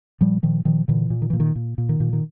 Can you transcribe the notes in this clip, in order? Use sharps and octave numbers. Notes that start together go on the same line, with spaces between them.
A#2 F3 G3
A#2 D#3 F3
A#2 D#3 F3
A#2 D3 E3
A#2
D#3
A#2 E3
D#3
A#2
A#2
D#3
A#2
D#3